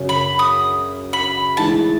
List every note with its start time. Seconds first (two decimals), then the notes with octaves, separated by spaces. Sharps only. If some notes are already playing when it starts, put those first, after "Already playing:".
Already playing: F#2 C#3 F#3 C#4 F#4
0.09 B5
0.39 D#6
1.13 B5
1.57 A2 E3 G#3 D#4 A5